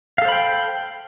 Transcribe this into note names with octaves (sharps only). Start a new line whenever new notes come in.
A4 C5 F5 G5 B5